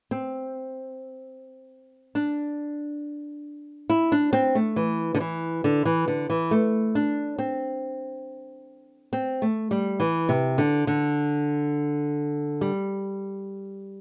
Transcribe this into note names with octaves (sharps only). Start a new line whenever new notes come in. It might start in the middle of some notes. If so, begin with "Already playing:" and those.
C4
D4
E4
D4
C4
A3
E3
D3
E3
D3
E3
D3
E3
A3
D4
C4
C4
A3
G3
E3
C3
D3
D3
G3